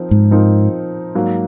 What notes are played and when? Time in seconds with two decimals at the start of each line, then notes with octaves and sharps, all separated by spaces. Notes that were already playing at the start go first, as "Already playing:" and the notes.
Already playing: F3 C4 D#4 A#4
0.11 G#2
0.31 F3 C4 D#4 A#4
1.15 G#2 F#3 A#3